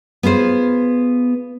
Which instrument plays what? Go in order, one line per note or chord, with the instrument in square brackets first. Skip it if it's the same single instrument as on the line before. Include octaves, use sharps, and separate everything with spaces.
[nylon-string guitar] B3 F4 G#4 C5